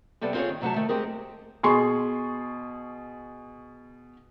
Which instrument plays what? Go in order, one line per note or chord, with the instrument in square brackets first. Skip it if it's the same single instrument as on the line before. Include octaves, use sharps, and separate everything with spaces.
[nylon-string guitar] C3 G3 B3 A4
C4 F4 G4 G#4 C#5
D#3
C3 F#3 A3 E5 A5
D#3 A3
G#3 C4 G4 G#4 A#4
[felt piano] B2 G#4 C6 C#6